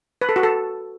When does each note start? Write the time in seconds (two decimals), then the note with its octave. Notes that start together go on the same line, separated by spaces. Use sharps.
0.21 B4
0.29 A4
0.36 F#4
0.43 A4